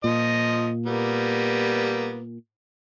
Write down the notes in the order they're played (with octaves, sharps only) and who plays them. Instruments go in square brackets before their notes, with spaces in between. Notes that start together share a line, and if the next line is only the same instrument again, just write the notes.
[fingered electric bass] A#2 [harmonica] F3 D#5
[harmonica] G3 A#3 B3